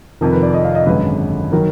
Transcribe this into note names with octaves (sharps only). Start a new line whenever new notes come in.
F1 F2 D#3 A#4
B4
D5
D#5
F5
D#5
G#1 F#2 D3 G#3 B4
D#3 F#3 A#4